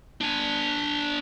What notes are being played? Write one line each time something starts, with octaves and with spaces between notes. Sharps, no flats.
D4 G#5